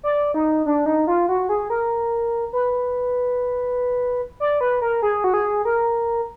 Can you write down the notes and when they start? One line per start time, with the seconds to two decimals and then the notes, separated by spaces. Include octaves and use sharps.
0.03 D5
0.34 D#4
0.66 D4
0.86 D#4
1.07 F4
1.29 F#4
1.49 G#4
1.70 A#4
2.53 B4
4.40 D5
4.61 B4
4.82 A#4
5.02 G#4
5.24 F#4
5.34 G#4
5.65 A#4